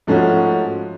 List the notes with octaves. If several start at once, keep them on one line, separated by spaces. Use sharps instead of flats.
G#2 F3 A3 C#4 F#4